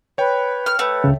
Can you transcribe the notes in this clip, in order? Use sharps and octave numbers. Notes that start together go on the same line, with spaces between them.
B4 C#5 G5
F6
A3 B4
C#2 C#3